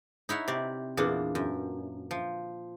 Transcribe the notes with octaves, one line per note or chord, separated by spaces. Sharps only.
D#4 E4 C#5 F#5
C3 D5
E2 A#2 D4 F#5
F#2
F3